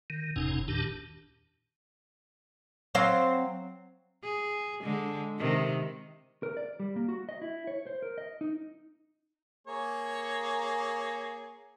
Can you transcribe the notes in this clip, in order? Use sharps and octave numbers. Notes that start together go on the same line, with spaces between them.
D#3
F#1 E2 G#2 C3 C#4 D#4
E2 A#2 D#3 D4 G4 A5
F#3 C4 F5
G#4
D3 G#3
C3 D#3
A#4
D5
G3
A#3
F#4
D#5
E4
C#5
C5
A#4
D#5
D#4
A#3 G#4 C#5